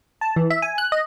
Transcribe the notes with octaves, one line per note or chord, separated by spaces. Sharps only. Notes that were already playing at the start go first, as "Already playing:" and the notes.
A5
E3
E5
G#5
F#6
D#5